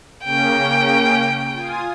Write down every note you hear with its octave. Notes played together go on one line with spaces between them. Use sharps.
C#3 A#3 C#4 G5
F4 G#5 D#6